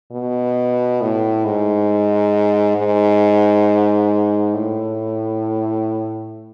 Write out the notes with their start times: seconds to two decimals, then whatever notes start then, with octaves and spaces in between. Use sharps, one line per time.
0.12 B2
1.01 A2
1.45 G#2
2.77 G#2
4.54 A2